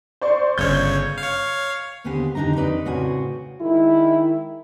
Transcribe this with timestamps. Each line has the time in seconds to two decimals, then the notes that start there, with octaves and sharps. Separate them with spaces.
0.21 C5 D5 C#6
0.58 G1 C#3 C#5 G6 G#6
1.18 C#5 F5
2.04 D#2 D3 B3 C4 G4 G#4
2.35 D3 D4 D#4 G4 A#5
2.55 C4 D#4 B4 D5
2.85 A2 C#3 C4 F#4 D5 G#5
3.60 D#3 G#3 E4